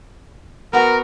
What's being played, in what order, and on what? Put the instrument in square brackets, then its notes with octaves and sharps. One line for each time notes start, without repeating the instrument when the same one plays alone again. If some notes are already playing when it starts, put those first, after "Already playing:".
[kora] B3 F#4 [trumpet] A#4